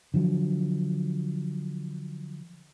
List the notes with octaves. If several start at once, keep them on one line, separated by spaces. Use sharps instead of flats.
D3 F3 F#3